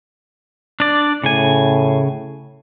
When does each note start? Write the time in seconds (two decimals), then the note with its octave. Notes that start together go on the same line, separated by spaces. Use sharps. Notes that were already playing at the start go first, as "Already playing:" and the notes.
0.80 D4 D5
1.24 A2 C#3 G#5